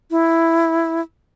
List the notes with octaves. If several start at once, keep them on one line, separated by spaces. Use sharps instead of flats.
E4